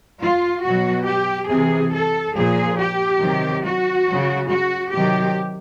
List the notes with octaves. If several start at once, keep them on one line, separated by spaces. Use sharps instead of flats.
F4
B2 F#3 F#4
G4
C3 E3 G#4
A4
A#2 F3 G#4
G4
C3 D#3 F#3
F#4
C#3 F#3
F#4
C3 D#3 F#3 G4